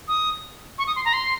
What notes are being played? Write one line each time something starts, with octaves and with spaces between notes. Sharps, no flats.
D#6
C#6
D#6
C6
A#5
C6